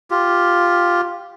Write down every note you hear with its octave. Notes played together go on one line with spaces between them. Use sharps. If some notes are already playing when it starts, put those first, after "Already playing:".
F4 G4